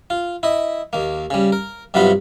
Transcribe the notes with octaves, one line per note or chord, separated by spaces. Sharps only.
F4
E4 D#5
D#2 A#3
C#3 G3
A#4
G2 C3 F#3 B3 F4 B5